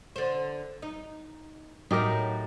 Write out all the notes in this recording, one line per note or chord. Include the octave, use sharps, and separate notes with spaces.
D3 C5
D#4
A2 F#3 D#4 G4 A#4